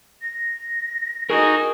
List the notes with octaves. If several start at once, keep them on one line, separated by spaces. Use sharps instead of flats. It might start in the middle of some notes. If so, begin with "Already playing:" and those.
A#6
D#4 F#4 G#4 A#4 D#5 G#5